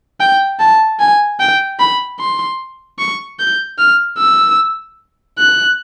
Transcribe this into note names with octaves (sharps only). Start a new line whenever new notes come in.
G5
A5
G#5
G5
B5
C6
C#6
G6
F6
E6
F#6